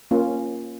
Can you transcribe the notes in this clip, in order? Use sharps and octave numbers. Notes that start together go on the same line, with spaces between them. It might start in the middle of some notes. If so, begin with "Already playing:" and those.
A#3 C#4 F4